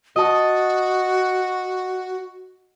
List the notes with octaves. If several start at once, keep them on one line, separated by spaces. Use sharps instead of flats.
F#4 D#5 A5